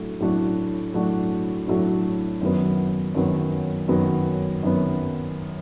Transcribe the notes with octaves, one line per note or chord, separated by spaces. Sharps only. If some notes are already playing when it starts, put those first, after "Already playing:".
Already playing: A2 F#3 A3 D4 F#4
A2 F#3 A3 D4 F#4
A2 F#3 A3 D4 F#4
A2 F#3 A3 D4 F#4
F#2 D#3 F#3 B3
F#2 D#3 F#3 B3
F#2 D#3 F#3 B3
F#2 D#3 F#3 B3